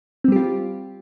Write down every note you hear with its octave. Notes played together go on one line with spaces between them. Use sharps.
G3 C4 F4 G4